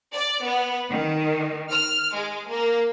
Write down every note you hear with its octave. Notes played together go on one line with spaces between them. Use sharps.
D5
B3
D#3
F6
G#3
A#3